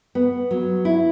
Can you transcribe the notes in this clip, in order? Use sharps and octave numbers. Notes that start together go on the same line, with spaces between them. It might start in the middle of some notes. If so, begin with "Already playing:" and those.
B3
F#3
E4